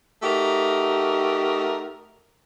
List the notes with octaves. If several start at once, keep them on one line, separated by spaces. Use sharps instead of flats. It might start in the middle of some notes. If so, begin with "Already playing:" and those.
A3 D#4 F#4 G4 A#4